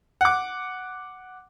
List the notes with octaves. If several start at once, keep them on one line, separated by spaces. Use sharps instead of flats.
F#5 D6